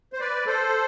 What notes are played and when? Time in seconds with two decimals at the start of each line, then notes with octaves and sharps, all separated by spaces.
0.13 C5
0.20 B4 D5
0.47 A4 C5